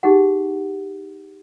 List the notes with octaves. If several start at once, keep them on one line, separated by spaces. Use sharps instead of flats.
D#4 G4 G#4 F#5